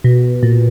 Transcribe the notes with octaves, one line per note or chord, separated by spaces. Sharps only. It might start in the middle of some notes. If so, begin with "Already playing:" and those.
B2
A#2